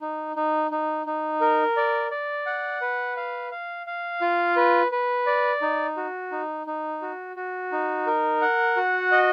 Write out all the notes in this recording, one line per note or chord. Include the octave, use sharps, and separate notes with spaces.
D#4
D#4
D#4
D#4
A#4
D5
D5
F#5
B4
F5
F5
F5
F4
B4
B4
D5
D#4
F#4
D#4
D#4
F#4
F#4
D#4
A#4
F#5
F#4
D#5